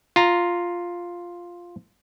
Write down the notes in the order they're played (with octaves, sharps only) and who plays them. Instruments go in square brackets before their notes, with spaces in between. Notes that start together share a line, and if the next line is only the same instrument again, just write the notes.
[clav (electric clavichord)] F4 A#5